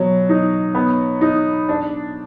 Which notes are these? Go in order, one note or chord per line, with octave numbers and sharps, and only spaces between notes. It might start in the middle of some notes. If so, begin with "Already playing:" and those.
Already playing: B2 F#3
D#4
B3
D#4
D4